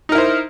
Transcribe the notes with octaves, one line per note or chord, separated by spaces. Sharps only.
D#4 E4 A#4 C5